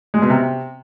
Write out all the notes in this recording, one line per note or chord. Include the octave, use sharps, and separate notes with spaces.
G#3
B2
C3